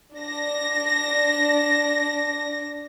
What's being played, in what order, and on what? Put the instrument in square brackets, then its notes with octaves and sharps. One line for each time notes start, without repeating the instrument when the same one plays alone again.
[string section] D4 A#6